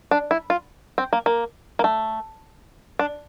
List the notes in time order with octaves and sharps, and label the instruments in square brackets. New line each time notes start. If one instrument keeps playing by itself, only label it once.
[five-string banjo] D4
E4
F4
C4
A#3
A#3
A#3
A3
D4